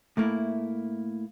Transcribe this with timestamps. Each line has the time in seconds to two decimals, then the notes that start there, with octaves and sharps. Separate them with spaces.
0.17 A2 A3 A#3 E4